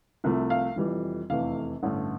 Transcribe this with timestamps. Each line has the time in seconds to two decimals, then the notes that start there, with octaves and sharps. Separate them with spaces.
0.24 C2 C3 F3 A3
0.50 F5
0.76 F1 F2 E3 G3
1.30 F1 E2 C3 E3 A3 F5
1.83 A1 G2 D3 A3